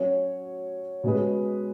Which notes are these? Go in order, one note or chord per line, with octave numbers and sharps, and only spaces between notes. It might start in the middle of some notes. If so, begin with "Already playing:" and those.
Already playing: F#3 C#4 F#4 C#5
B2 G#3 C#4 G#4 B4